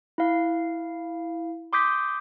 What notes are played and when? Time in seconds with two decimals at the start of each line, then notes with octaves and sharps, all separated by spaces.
0.18 E4 F5
1.73 C6 D6 D#6 G6 B6